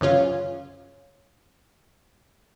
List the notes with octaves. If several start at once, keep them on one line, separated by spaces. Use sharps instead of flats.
F#2 C#3 C#4 F4